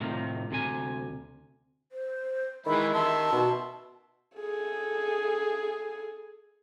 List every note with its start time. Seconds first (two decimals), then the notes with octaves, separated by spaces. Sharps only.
0.01 A2 C3 D#3 F3
0.51 D2 C3 G#5
1.92 C5
2.66 D#3 E3 G#3 E5 B5
2.94 E5 A5 C6
3.32 B2
4.38 G#4 A4